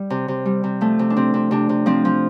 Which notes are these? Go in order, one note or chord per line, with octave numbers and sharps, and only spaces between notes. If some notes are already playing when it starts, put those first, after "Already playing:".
Already playing: G3
C3
C3
G3
C3
F3 A3
C3
D4
C3 C4
C3
C3 D4
C3
F3 C4
F3